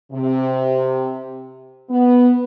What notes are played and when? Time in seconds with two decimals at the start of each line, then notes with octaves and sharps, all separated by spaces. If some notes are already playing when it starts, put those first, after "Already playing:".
0.12 C3
1.90 B3